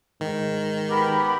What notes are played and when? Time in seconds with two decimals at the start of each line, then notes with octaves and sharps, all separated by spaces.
0.21 G#2 D#3
0.89 B3 G4 A#4 B5